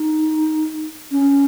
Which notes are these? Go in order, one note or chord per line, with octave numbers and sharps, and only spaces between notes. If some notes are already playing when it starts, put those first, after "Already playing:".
Already playing: D#4
C#4